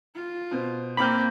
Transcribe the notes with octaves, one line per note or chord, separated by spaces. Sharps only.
F4
B2 C5
A#3 C4 A#5 B5 D6 F6 G6